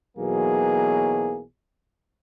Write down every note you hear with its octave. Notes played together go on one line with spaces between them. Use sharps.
B1 B2 E3 F#3 A#3 G#4